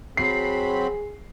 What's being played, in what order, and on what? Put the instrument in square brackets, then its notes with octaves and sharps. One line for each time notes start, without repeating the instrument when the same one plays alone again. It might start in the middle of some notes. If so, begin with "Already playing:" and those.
[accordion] F#3 C4 B5 [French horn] G#4 [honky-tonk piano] C7